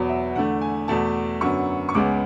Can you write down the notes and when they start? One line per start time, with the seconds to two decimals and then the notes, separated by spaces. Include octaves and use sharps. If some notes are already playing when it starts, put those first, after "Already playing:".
Already playing: E2 B2 F#3 B3
0.09 E5
0.35 E2 D3 A3 F#5
0.61 G#5
0.88 E2 B2 A3 A5
1.41 F#2 D3 F#3 B3 C#6
1.89 C#6
1.94 C#2 C#3 G#3 B3 D6